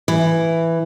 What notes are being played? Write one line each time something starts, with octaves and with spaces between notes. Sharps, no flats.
E3